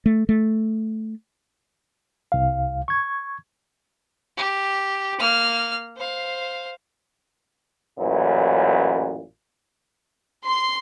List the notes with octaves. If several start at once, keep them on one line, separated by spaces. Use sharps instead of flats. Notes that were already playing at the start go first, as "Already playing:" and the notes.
A3
A3
C2 F5
C#6 G#6
G4
A#3 F6
C5 F5
A1 F#2 A#2 E3
C6